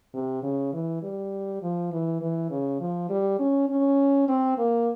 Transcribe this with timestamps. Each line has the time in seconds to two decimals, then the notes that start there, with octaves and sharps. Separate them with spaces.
0.14 C3
0.43 C#3
0.73 E3
1.03 G3
1.62 F3
1.92 E3
2.21 E3
2.50 C#3
2.80 F3
3.09 G3
3.39 C#4
3.69 C#4
4.28 C4
4.58 A#3